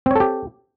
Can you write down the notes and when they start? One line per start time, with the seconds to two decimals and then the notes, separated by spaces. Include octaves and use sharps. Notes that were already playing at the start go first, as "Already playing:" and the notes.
0.06 C4
0.11 C#5
0.16 A4
0.20 G4